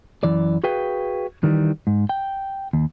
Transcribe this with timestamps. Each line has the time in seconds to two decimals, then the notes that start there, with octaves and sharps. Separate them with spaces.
0.23 F#2 E3 D5
0.64 F#4 G#4 B4 F5 G5
1.44 D#3 E3 G3
1.87 G#2
2.09 G5
2.73 D#2